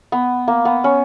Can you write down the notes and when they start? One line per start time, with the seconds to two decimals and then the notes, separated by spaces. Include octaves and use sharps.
0.12 B3
0.48 A#3
0.65 B3
0.84 C#4